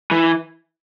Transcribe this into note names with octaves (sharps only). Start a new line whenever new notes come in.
E3